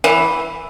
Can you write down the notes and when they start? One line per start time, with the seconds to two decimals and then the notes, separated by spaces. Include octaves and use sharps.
0.04 E3